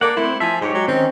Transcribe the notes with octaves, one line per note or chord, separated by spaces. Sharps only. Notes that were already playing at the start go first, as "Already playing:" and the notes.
A#3 A4 D5 F#5
A3 C4 E4 C5
F3 E5 G#5
G#2 G#3 G4 C#5
F#3
D#3 C4 C#4 D#4